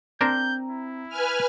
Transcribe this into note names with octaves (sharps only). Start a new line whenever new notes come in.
C4 D4 A#4 C5 A#5 G6
E4
B4 G#5 F6